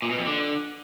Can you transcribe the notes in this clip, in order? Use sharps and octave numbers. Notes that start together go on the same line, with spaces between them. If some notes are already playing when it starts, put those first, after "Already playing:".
A#2
B2
F2
D3